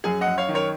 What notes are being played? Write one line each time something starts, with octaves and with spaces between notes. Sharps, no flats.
F#2 G#4
D#5 F#5
F#2
C#5 F5
D#3
A#4 C#5